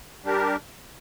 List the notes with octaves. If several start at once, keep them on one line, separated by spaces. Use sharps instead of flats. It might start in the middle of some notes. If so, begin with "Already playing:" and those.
G3 D4 G4 A#4